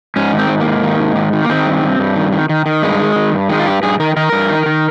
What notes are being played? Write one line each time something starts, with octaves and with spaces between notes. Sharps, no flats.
G#2 C#4
D#3
C4
G#2
A#3
G#2
D#3
G#2
D#3
D#3
A#3
D#3 C4
G2
G2
G2
D#3
D#3
D#3
D#3
G2 G#3
D#3
D#3
G2
D#3 G#3
F4
G2 G4
G2 G#4
D#3 A#4
D#3 A#4
G2
D#3
D#3